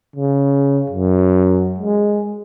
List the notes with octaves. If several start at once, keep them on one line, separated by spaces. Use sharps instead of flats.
C#3
F#2
G#3